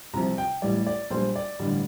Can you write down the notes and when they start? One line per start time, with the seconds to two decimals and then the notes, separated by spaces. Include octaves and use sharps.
0.13 C2 C3 F3 A#5
0.38 G5
0.62 A1 A2 G3 D5
0.87 D5
1.10 A#1 A#2 G3 C5
1.36 D5
1.60 A1 G2 D3 G3